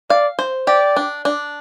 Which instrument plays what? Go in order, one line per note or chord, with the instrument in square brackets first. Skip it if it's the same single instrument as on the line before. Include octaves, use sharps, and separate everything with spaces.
[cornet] D5 [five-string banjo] F5
[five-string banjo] C5
[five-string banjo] G4 [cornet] D5
[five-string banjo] D4
D4